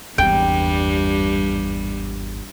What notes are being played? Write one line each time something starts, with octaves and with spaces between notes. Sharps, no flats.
G#1 E2 G2 G3 G5